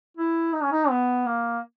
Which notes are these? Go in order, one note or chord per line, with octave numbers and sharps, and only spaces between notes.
E4
D#4
C#4
D#4
B3
A#3